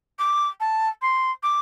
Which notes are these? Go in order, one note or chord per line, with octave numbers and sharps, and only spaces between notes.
D6
A5
C6
D6